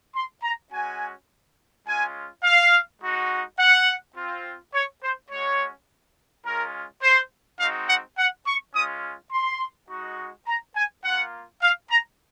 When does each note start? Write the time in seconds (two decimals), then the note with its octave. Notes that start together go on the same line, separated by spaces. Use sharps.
0.15 C6
0.44 A#5
0.72 G#3 C#4 F#4 G#5
1.87 G#3 C#4 F4 G#5
2.44 F5
3.02 G#3 D#4 F#4
3.59 F#5
4.17 C4 F4
4.74 C#5
5.03 C5
5.31 G#3 C#4 F#4 C#5
6.46 G#3 C#4 F4 A#4
7.03 C5
7.60 G#3 C4 D#4 F#4 F5
7.89 F#5
8.18 F#5
8.47 C#6
8.75 G#3 C#4 F4 D#6
9.33 C6
9.90 G#3 D#4 F#4
10.47 A#5
10.76 G#5
11.05 A#3 F4 F#5
11.62 F5
11.91 A#5